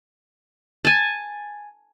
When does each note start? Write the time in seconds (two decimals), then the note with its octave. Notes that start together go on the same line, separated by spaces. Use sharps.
0.85 G#5 A5